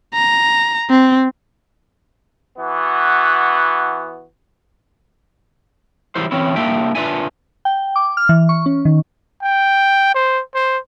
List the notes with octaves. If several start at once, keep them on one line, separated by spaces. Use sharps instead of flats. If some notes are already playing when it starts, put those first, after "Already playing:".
A#5
C4
E3 B3 F#4
E3 F#3 G3 E4 C5
E3 C4 C#4 E4
G3 A#3 D4 E4 E5 G5
D4 F4 B4 D5 E5 G#5
G5
D6
F6
E3
C#6
C#4
D#3
G5
C5
C5